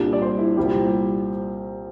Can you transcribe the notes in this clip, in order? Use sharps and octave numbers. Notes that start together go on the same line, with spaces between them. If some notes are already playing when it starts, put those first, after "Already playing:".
Already playing: C2 A#2 G3 D4
D5
C5
E4
C2 A#2 G3 C4 G4